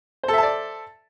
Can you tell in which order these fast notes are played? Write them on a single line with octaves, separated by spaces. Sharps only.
C5 A4 E5 A5 D5